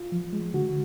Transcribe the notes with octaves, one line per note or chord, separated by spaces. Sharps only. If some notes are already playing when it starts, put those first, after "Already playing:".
Already playing: F4
F3
G#3
D3 F#4